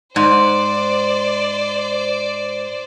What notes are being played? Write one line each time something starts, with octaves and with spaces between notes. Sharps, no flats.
G#2 C5 D5